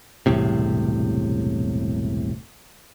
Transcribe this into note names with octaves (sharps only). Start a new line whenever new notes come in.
E1 C2 A2 C3